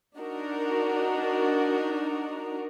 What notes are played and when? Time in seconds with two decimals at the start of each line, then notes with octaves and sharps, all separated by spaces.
0.17 D4 D#4 F#4 A#4